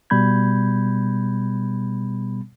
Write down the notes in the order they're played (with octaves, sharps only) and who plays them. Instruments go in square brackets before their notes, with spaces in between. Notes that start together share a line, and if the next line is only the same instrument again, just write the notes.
[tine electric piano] B2 G3 B3 B5 G6 G#6